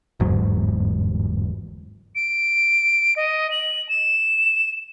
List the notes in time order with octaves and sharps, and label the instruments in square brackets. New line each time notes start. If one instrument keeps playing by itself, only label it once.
[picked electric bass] G1 E2 G#2 F#3
[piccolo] D7
D#5
F#7
E7